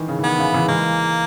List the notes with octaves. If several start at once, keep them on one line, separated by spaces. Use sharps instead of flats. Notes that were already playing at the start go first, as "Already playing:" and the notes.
Already playing: D#3 E3
C#3
E3
D#3 B3
C#3 E3
C#3 E3
E3 G#3 A#3